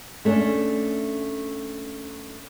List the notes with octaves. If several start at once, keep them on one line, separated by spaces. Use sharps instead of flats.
A3 C#4 D4